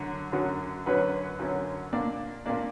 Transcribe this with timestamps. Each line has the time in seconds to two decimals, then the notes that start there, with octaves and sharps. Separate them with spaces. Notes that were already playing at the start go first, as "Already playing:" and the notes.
Already playing: F#2 D3 F#3 C#4
0.32 F#2 D3 F#3 C#4
0.86 F#2 D3 F#3 C#4 B4
1.39 F#2 D3 F#3 C#4
1.93 A#2 A#3 D4 D5
2.46 A#2 A#3 D4 D5